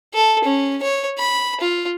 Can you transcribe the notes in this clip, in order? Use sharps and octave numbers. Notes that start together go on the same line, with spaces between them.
A4
C#4
C#5
B5
F4